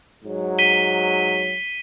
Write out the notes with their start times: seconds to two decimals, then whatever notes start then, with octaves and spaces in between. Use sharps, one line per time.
0.24 G#2 F#3
0.59 B6 D#7 G7